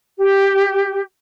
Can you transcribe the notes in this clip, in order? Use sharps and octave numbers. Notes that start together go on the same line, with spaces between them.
G4